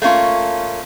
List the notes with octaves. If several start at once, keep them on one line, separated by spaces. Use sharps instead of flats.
A3 A#3 C#4 F4